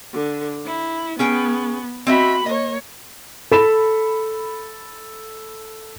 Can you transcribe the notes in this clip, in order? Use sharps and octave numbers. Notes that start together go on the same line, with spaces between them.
D3
E4
B3 C#4 G#4 G5
C4 F#4 D#5 E5 B5
A#3 C#5 D#5
A4 B5 E7